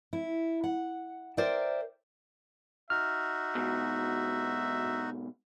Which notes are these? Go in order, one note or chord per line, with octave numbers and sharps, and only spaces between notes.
E4
F#5
A#4 C5 D5 E5 G5
D#4 F#4 E5 F6
G#2 B2